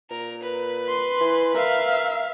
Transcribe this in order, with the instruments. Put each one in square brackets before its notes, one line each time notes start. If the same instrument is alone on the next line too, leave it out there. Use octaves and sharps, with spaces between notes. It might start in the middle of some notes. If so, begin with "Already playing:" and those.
[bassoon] A#2 [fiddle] A#4
[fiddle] B4
[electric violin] C6
[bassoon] E3
[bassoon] A#4 [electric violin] E5 F5